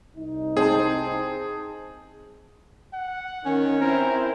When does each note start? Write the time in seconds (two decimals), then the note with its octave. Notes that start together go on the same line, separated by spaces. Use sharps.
0.15 C2 D#4
0.57 C4 G#4 C5 A5
2.93 F#5
3.46 D#3 C#4
3.81 C4 E4 A#4 C5